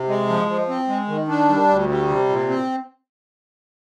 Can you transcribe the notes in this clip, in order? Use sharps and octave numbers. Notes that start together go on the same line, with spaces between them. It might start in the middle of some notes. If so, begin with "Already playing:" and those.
Already playing: C3
G#3
F3
F3
C4
G#3
D#3
D4
G3
D2
G3
C3
A#2
C4